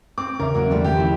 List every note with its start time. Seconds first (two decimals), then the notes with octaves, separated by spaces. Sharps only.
0.18 C4 D6
0.40 E2 C#3 C#4 A#4 E5
0.54 F#3 A#3 F#4
0.71 D#3 F3 G3 A3 C4
0.84 G4
0.97 E4 C5